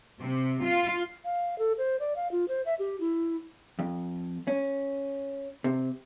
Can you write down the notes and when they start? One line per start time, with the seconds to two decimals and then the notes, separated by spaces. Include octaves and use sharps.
0.19 C3
0.63 F4
1.25 F5
1.59 A4
1.78 C5
2.00 D5
2.16 F5
2.32 F4
2.49 C5
2.66 E5
2.79 G4
3.00 E4
3.79 F2
4.47 C#4
5.64 C3